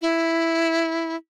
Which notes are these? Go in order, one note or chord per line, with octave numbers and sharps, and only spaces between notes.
E4